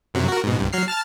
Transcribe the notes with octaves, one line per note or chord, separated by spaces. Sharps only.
F#2 C3 F#3
F#4 A#4
G#2 B2
C2 G2
F#3 F6 C7
A5 F6 A6